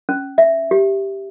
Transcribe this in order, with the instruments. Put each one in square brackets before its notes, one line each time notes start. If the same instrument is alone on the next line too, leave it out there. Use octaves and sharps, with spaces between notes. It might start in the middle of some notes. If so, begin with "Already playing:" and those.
[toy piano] C#4
E5
G4